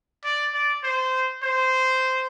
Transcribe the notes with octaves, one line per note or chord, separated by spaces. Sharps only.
D5
D5
C5
C5